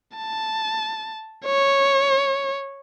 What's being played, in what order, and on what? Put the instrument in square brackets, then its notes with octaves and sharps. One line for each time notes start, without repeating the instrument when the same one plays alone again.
[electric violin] A5
C#5